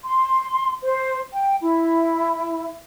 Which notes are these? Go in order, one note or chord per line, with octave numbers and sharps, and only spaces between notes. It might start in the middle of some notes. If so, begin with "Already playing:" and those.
C6
C5
G5
E4